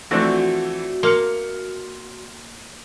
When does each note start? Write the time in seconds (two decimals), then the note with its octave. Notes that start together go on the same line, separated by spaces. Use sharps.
0.11 E3 F3 A3 C4 D4 F#4
1.03 A#3 C6 F6 C#7